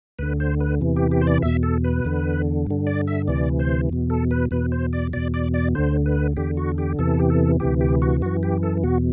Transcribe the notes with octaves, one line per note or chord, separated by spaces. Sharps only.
D2 D3 B4
C5
B4
E2 C3 E3
G4
G4
C5
D5
E2 B2 E5
A4
B4
E2 D3
G2 D3
D5
E5
D2 C3 E3 D5
C5
E2 B2
A4
B4
E2 B2 B4
C5
D5
E2 B2 D5
D5
D5
D2 D3 C5
B4
E2 D3 G4
F#4
G4
E2 C3 E3 A4
G4
A4
D2 C3 E3 G4
G4
F#4
F#2 E3 F#4
G4
A4
E2 B2 F#4